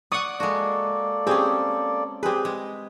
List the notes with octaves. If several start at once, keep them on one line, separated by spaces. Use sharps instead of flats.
D5 F#5 C#6 D#6
G#3 A#3 F#4 A4 D5
C4 C#4 G4 G#4
C4 G4 G#4 B4
G#3